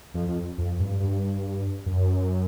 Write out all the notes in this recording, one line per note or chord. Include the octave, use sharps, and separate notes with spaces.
F2
F2
F2
G2
G2
F#2